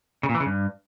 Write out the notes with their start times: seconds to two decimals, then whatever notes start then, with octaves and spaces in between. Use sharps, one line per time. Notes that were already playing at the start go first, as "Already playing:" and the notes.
0.23 C#3
0.29 A#2
0.35 E3
0.40 C#3
0.46 G2